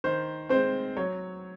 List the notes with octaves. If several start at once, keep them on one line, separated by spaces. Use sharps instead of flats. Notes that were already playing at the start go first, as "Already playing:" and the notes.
D#3 C5
G#3 C4 C5
F#3 C#5